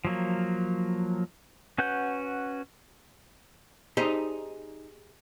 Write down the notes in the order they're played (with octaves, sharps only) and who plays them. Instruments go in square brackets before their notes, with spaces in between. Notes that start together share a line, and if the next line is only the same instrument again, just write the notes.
[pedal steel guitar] F3 F#3 A#3
C#4 F#4 B4 F#5 G6
[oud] D#4 [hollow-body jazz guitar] G4 G#4 C5